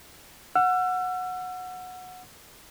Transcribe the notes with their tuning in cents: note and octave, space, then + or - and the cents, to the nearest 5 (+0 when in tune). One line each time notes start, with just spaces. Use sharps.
F#5 -15 E6 +35